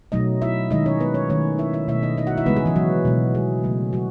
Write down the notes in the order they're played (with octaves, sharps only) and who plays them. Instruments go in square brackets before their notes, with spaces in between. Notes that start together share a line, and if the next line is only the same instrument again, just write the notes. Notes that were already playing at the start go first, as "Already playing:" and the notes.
[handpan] B2 F#3 A3 D#4 D#5
E4 E5
D#3 G#3 D#4 D#5
C#4 C#5
B3 B4
C#4 C#5
D#3 A3 C#4 C#5
E4 E5
E4 E5
B2 A3 E4 E5
D#4 D#5
D#4 D#5
F#4 F#5
E4 E5
C#3 G#3 B3 B4
G#3 G#4
E3 E4
F#3 F#4
B2 G#3
G#3 G#4
C#3 F#3 A3
F#3 F#4